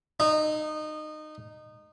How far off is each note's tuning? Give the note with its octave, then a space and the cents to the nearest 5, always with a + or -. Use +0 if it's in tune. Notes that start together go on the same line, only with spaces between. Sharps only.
D#4 -20